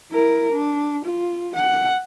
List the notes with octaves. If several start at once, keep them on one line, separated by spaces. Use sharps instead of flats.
E4 A#4
D4
F4
F#5